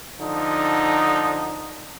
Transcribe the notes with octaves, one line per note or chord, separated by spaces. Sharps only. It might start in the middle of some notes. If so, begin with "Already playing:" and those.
D3 F3 D#4